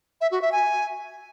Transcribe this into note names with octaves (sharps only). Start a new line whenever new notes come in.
E5
F#4
E5
G#5